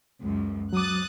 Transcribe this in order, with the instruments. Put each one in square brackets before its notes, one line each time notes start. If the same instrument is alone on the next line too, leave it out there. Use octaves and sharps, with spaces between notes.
[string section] C#2 F#2
[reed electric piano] F#3 D6 [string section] D#6 F#6 A6